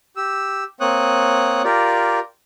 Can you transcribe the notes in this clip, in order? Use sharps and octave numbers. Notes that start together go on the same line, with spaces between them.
G4 E6
A#3 C4 C#5 D#6 F#6
F4 G4 A#4 D5